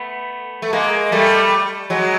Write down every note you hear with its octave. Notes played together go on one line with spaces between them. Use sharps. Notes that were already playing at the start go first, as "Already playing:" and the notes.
Already playing: A3 B3
A3
G#3 A#3
G3 A3
F#3 G#3